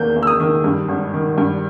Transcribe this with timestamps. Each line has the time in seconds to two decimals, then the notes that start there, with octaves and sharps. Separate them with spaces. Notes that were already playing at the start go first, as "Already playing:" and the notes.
Already playing: E2 D#3 A#3 G6
0.16 A#3
0.23 E6
0.27 D#6
0.40 D#3
0.64 G2
0.88 G#1
1.14 D#3
1.38 G2